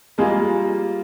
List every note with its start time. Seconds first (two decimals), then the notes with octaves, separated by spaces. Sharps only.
0.18 G3 G#3 A#3 F4